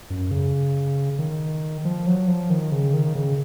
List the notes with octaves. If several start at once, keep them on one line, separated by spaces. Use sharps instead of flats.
F#2
C#3
D#3
F3
F#3
F3
D#3
C#3
D#3
C#3